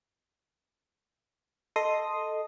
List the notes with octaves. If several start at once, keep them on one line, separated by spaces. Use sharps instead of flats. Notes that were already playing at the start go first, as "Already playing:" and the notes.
A4 D#5 C6 D#6